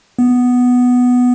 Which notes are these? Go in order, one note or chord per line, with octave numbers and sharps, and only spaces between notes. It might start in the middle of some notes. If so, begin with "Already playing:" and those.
B3